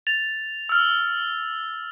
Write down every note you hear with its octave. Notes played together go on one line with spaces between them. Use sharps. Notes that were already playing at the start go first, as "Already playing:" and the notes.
A6 F7
E6 F6